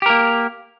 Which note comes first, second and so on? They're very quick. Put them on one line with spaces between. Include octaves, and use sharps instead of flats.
G4 A#4 A#3